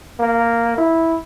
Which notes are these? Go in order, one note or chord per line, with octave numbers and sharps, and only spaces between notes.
A#3
E4